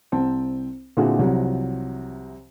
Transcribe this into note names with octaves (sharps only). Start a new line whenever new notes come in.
C2 C4 A5
A#2 D3 C4 E4 F#4 G#4
C2 C3 F3 F#3